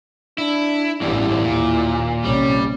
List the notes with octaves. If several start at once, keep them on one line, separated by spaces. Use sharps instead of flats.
D4 E4
A1 E2 G2 D3 G3 E4
D#2 A#2
A#1 C3 G3 C#4